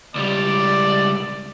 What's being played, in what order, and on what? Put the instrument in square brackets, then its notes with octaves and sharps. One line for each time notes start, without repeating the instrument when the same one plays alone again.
[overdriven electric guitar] C#2 G3 [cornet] D5